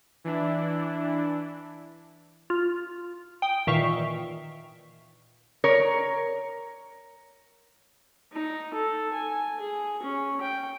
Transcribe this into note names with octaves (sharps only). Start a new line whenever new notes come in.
E3 D4 E4
F4
G5 D#6
A#2 D#3 E3 E5 F5 C#6
A#4 C#5
D#4
A4
G#5
G#4
C#4
G5